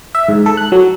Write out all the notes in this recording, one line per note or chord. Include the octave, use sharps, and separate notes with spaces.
E5
G#2
A4
F#6
F#3